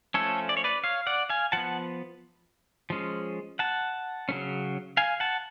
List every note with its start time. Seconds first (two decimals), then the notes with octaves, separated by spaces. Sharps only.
0.14 F3 A3 C#4 A4 C#5
0.49 D5
0.57 C#5
0.64 B4 D5
0.84 C#5 F5
1.07 D5 F#5
1.30 F5 G#5
1.52 F3 B3 F#5 A5
2.90 F3 G#3 C#4
3.59 F#5 A5
4.29 C#3 F#3 A3 C#4
4.97 F5 G#5
5.20 F#5 A5